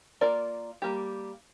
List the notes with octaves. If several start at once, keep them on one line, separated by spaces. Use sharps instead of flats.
A#3 F4 A#4 D5
G3 A#3 G4